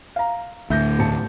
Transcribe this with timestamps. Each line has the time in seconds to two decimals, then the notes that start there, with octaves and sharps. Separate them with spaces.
0.16 F5 A#5
0.70 D2 A2 E5 G6 A#6
0.99 A1 A5 C#7